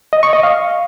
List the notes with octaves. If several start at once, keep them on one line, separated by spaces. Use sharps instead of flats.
D#5
C#6
D#5
F5